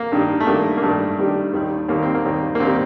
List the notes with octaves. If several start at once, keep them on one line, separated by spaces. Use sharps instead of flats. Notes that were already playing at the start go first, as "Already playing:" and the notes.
Already playing: A#3
G2 D#3 G3
A3
G2 D#3 G3 A#3
A#3
G2 D#3 G3 A3
G2 D#3 G3
D#2 D#3 G3
D#2 D#3 G3 A#3
C4
A#3
D#2 D#3 G3
A#3
D#2 D#3 G3 C4